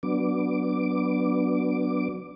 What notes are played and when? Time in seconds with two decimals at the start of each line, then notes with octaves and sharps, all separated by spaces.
0.03 F#3 B3 D4 D6